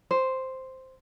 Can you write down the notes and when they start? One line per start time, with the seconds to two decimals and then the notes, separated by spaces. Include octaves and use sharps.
0.11 C5